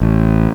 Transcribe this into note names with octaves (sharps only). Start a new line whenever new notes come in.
A1